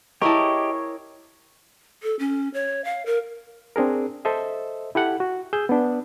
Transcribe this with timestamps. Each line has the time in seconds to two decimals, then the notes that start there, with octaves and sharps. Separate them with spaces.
0.22 E4 G4 G#4 A#4 C#5 D#5 A5
2.03 A4
2.19 C#4
2.54 C#5
2.85 F5
3.06 A#4
3.76 C4 D4 G#4 A#4
4.25 A4 C5 D#5 E5
4.95 E4 G4 A4 F#5
5.20 F#4
5.53 G#4 E6 G6
5.69 B3 D4